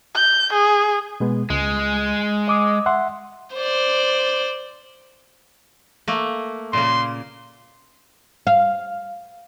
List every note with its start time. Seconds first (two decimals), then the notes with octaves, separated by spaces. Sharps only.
0.15 G6
0.53 G#4
1.20 B2 G#3 B3
1.50 C#2 G#3
2.48 D#5 D6 D#6
2.86 E5 F#5 C6
3.54 C5 D5
6.08 A3 A#3
6.73 A#2 C#3 A#3 C6
8.47 F5